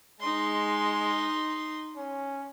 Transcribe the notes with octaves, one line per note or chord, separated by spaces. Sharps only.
G#3 D#4 C6
C#4